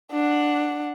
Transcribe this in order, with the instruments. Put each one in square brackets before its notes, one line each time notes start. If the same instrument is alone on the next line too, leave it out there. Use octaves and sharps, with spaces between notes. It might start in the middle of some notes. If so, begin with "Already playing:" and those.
[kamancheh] D4 F#5